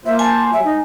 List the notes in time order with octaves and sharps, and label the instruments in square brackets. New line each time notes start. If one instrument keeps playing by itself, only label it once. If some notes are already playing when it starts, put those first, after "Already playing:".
[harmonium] A#3 F4 C5 [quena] E5
[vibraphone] G#5 [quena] A5
[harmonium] F#3 G3 [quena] E5
[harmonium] G#2 [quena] D#4